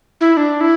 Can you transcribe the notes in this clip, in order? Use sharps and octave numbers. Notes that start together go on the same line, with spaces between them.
E4
D4
E4